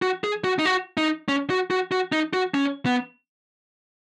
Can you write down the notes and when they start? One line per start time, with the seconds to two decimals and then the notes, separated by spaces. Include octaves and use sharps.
0.02 F#4
0.24 G#4
0.44 F#4
0.59 D#4
0.65 F#4
0.97 D#4
1.29 C#4
1.50 F#4
1.71 F#4
1.92 F#4
2.12 D#4
2.33 F#4
2.54 C#4
2.86 B3